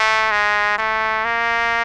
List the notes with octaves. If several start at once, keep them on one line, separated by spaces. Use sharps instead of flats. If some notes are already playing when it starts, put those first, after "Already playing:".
Already playing: A3
G#3
A3
A#3